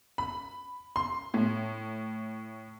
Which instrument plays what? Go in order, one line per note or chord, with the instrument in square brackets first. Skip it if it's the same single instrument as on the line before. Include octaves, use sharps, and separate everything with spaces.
[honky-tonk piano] B5
C6
A2